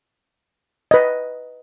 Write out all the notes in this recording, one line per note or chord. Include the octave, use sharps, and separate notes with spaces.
B4 D#5